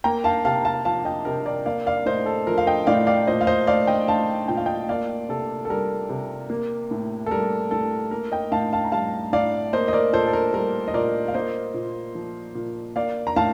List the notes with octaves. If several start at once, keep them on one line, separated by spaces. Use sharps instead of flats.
A#3 G5 A#5
F5 A5
C3 F5 A5
F5 A5
F3 F5 A5
D#5 G5
C3 A#4
A#4 D5
A#3 D5 F5
D5 F5
A2 C5 D#5
A4
F3 A#4
F5
D#5 G5
A2 D5 F5
D5 F5
A#2 C5 D#5
F5
C5 D#5
A3 D5 F5
D#5 G5
A3 F5 A5
A#2 G5
F5
D#5 G5
A#3 D5 F5
C3 A4
A4
G3 A#4
C3
A#3
A2
A4
G3 A#4
A2 A4
A#3 A#4
D#5 G5
A2 F5 A5
F5 A5
A#5
G3 F5 A5
A2 D5 F5
A#3 C5 D#5
D#5
A#4 D5
A#2 A4 C5
A4
A#4
G3 A#4
D#5
A#2 A#4 D5
F5
A#3 C5 D#5
A#2
F3
A#2
A#3 D5 F5
A#5
A2 F5 A5